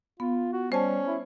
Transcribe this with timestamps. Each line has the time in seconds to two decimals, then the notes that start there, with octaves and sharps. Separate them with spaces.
0.20 B3 F4
0.53 F#4
0.72 G3 C#4 C5 A5
1.07 E4